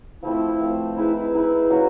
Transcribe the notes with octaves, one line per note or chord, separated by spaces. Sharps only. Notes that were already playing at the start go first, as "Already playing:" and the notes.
F3 A3 C4 E4
F3 A3 C4
D#4 E4 G#4 B4
E4
D#4 E4 G#4 B4
F#3 A#3 C#4 F#4